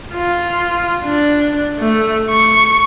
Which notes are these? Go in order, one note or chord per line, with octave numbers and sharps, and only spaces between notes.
F4
D4
A3
C#6